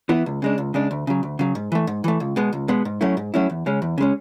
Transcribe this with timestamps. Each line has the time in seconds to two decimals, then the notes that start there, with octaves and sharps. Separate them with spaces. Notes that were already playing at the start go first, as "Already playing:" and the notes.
0.09 E3 B3 E4
0.26 C#2
0.42 C#3 G#3 D4
0.58 C#2
0.74 C#3 G#3 D4
0.91 D2
1.07 C#3 F#3
1.23 D2
1.39 C#3 F#3
1.55 G#2
1.72 E3 A3
1.87 G#2
2.04 E3 A3
2.20 C#2
2.36 B2 G#3 B3
2.53 C#2
2.68 B2 G#3 B3
2.85 G#2
3.01 F#3 A3 C#4 E4
3.17 G#2
3.34 F#3 A3 C#4 E4
3.50 E2
3.66 C#3 G#3 C#4
3.82 E2
3.98 C#3 G#3 C#4